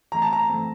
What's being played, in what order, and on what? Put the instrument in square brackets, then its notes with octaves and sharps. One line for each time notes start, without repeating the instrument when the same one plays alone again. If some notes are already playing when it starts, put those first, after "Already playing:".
[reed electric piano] G2 E3 A3 C4 [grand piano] A#5
[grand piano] A5
A#5
[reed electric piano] E3 A3 C4